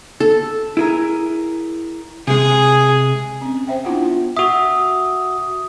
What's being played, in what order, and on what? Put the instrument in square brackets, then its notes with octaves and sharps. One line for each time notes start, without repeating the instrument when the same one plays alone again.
[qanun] A4
[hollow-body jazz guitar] E4 G#4 A#4
[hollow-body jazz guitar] C3 G#3 [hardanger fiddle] G#4
[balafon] C4 C#4
C5 E5 G5
B3 D4 E4 F4 F#5
[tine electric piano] F#4 E5 [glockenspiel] D#6